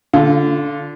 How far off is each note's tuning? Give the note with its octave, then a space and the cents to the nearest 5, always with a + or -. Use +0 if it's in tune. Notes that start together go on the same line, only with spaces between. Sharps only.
D3 -15 F4 +0